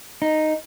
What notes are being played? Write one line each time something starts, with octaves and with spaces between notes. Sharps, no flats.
D#4